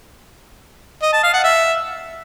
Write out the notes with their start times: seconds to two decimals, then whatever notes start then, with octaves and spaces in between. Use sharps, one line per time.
1.02 D#5
1.13 A5
1.23 F5
1.34 F#5
1.44 E5